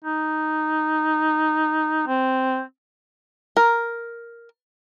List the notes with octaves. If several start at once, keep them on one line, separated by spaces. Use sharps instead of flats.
D#4
C4
A#4